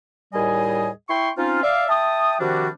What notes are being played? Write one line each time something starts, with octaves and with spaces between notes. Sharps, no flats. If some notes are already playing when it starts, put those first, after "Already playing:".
D#2 A2 G3 G#4 D#5 G#5
E4 G5 C6 C#6
C4 C#4 D#4 F4
D5 E5 F5
E5 G5 A5 D#6
C3 D#3 F3 G3 D4 F#4